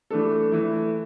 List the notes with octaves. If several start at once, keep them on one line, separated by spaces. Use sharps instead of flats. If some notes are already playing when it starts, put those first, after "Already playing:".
E3 A3 D4 A4
E3 A3 E4